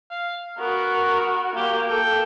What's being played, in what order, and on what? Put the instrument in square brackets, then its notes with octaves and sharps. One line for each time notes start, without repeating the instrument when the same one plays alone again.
[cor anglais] F5
[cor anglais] B3 [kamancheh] F#4 A#4
[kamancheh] A#3 [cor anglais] G4
[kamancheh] A4 [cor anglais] G5